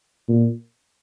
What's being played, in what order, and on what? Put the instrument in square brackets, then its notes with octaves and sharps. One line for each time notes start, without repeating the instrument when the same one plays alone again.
[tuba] A#2